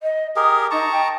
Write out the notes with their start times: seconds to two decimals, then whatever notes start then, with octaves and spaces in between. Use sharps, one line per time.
0.02 D#5
0.36 G4 G#4 A#4 D#6
0.71 D#4 A5 A#5 C#6
0.92 G5